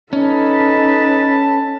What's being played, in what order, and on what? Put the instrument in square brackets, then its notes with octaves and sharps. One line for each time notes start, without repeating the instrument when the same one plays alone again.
[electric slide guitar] C#4 [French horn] D#4 [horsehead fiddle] A4 B4 [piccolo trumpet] A5